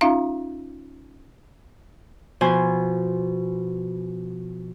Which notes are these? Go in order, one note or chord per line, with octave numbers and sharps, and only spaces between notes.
C#4 D#4 F4 E5 F5 A#5
B2 F3 C5 G#5